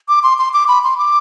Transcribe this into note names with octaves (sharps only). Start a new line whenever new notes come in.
D6
C6
C6
D6
B5
C6
D6